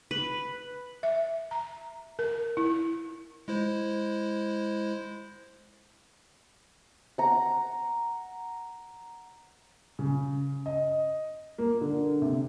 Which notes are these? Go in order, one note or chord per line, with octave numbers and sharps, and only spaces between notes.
B4
E5
A#5
A#4
E4
G#3 E4 C5
F#5 A#5
C#3
D#5
A#3
D3
C3